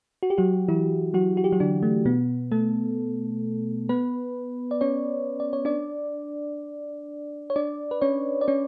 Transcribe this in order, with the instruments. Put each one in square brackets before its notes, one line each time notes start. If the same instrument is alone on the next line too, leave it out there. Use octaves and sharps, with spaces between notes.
[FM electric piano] F#4
G4
F#3 F#4
E3 E4
F#3 F#4
F#4
G4
F#3 F#4
D3 D4
A3
B2 B3
A3 A4
B3 B4
D5
C#4 C#5
D5
C#5
D4 D5
C#5
D4 D5
B4
C#4 C#5
D5
C#4 C#5